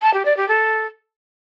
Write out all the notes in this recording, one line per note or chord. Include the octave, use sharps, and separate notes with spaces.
A5
G4
D5
G4
A4